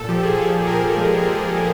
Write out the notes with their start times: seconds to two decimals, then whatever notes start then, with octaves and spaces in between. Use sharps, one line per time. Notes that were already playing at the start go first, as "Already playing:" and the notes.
Already playing: A#2 A4
0.08 F3 G4
0.23 G#4
0.37 A#2 A4
0.66 A#2 A#4
0.97 G#3
1.26 F3
1.55 A#2